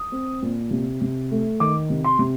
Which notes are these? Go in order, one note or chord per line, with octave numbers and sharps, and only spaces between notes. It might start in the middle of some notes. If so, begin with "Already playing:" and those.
Already playing: D#6
C4
A#2
C3
C3
A3
D#3 D6
C3
C6
C3